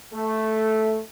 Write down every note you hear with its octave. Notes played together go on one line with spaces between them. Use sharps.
A3